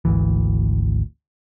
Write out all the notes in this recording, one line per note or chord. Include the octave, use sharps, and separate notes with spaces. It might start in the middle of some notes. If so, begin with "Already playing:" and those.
G#1 D2 E3